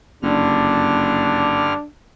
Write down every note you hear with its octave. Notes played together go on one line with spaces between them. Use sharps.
F#1 G2 D3 D4 F6